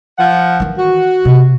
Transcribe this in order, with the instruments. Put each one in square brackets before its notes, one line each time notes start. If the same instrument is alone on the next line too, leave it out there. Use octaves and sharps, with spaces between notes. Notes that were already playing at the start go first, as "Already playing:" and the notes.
[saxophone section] F3 F#5
[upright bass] D#3 E3
[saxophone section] F#4
[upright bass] C3